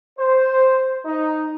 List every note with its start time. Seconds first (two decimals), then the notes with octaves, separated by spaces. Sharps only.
0.19 C5
1.05 D#4